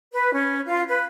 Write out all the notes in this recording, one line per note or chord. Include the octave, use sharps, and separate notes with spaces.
B4
C#4
F4
B4